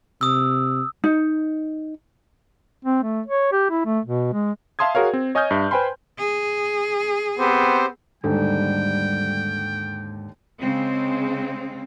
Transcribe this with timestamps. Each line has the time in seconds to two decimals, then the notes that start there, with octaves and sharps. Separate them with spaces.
0.21 C3 D#6 E6
1.04 D#4
2.85 C4
3.03 A3
3.26 C#5
3.52 G4
3.70 E4
3.85 A3
4.05 B2
4.33 G#3
4.79 E5 F5 A5 C6 D#6 G#6
4.95 F#4 G#4 A#4 C#5 F5
5.13 C4
5.35 C#5 D#5 G#5 D#6 F6 G6
5.51 G2 E5
5.71 B4 C5 G5 G#5 B5 C6
6.18 G#4
7.39 B3 C4 G4 C5
8.24 D#2 G#2 D3 G3 A4 G5
10.59 C#3 G#3 C4